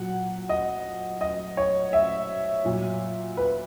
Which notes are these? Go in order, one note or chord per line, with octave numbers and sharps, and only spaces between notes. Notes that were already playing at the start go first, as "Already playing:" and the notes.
Already playing: A#2 F#3 F#5
D#5
D#5
C#5
E5
A#2 F#3
B4